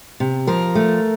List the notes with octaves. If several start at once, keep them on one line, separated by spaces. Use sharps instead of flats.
C3
F3 A#4
A3